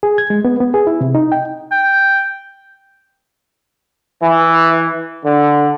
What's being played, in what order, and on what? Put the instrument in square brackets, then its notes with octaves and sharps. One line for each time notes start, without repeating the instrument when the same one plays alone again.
[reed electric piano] G#4
G#6
G#3
B3
B3
G#4
E4
C3
D#4
G5
[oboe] G5
[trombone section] E3
D3